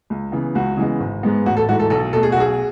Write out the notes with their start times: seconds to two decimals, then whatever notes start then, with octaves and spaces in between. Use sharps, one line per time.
0.10 C#2
0.32 C#3 E3 B3
0.55 C#2 F#4
0.77 C#3 E3 G#3 B3
1.00 G#1
1.23 G#2 G#3 B3
1.46 A1 F#4
1.57 A4
1.68 G#2 E3 A3 F#4
1.80 A4
1.90 B1 A4
2.13 B2 A3 A4
2.23 G#4
2.32 F#4
2.36 B1 G#4